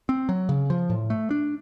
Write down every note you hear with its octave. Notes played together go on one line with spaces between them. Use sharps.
C4
F#3
C#3
F3
A2
A3
D4